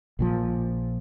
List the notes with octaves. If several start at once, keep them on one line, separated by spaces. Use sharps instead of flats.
A#1 A#2 F3